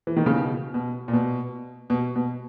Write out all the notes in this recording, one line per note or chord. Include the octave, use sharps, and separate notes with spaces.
E3
D#3
C#3
B2
B2
A#2
B2
B2
B2